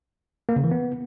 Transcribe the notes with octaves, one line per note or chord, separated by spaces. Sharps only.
A#3
C#3
E3
B3